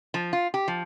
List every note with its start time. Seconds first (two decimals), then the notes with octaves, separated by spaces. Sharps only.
0.14 F3
0.33 F4
0.54 G4
0.68 F3